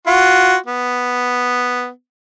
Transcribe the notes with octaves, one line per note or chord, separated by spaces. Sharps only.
F4 F#4
B3